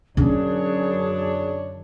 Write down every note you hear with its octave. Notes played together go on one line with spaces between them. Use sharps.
F#2 D3 C#4 D4 G#4 C#5